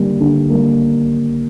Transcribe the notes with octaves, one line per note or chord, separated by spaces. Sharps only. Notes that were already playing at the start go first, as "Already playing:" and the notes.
Already playing: D3 G3 A#3
D3
G3 A#3